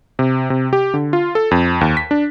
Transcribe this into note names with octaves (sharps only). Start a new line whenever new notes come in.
C3
C3
G4
D3
F4
A4
F2
D#2
B6
D4